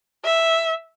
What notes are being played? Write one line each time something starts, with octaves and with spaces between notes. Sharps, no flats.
E5